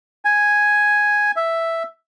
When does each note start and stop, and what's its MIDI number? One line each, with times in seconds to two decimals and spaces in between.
0.25 1.31 80
1.36 1.83 76